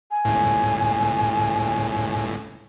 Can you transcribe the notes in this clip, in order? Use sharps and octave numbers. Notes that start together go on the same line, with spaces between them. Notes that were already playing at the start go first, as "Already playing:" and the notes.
G#5
G1 C#2 A2